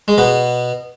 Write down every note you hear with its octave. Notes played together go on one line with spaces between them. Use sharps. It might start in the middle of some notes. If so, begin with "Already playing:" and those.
G#3
B2 B3